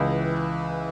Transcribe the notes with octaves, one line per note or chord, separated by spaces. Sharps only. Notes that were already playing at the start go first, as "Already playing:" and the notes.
Already playing: C#2 E3